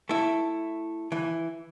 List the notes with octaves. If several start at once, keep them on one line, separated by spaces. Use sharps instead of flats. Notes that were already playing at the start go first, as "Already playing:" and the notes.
A3 E4
E3